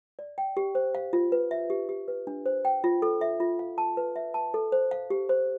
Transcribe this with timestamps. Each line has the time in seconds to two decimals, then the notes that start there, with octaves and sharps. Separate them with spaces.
0.19 D5
0.38 G5
0.57 G4
0.75 C5
0.95 F5
1.13 F4
1.32 B4
1.51 E5
1.70 G4
1.89 G4
2.08 B4
2.27 D4
2.46 C5
2.65 G5
2.84 F4
3.02 A4
3.21 E5
3.40 F4
3.59 F5
3.78 A5
3.97 B4
4.16 E5
4.34 A5
4.54 A4
4.72 C5
4.91 F5
5.10 G4
5.29 C5